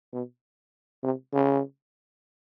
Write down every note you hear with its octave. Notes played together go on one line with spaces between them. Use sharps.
B2
C3
C#3